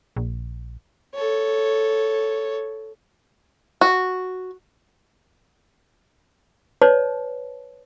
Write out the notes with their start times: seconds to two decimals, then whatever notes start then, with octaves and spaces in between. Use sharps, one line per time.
0.16 A#1
1.14 A4 C#5
3.81 F#4
6.82 B4 C#5 D5 A5